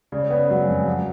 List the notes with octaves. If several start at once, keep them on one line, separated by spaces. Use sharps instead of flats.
C#3 D5
C#5
B3 D5
F5
F#3 F#5
G#5
F2
G#5
F#3 F#5